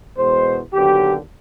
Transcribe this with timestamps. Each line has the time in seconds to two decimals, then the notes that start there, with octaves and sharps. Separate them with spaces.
0.16 E2 B2 G#3 C5
0.73 D#2 D3 F#3 B3 G4